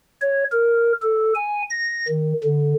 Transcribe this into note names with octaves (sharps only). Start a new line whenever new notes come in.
C#5
A#4
A4
G#5
A#6
D#3
D3